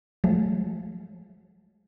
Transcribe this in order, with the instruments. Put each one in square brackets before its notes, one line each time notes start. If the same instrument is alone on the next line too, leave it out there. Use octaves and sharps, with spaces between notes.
[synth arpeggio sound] F3 F#3 G#3 A3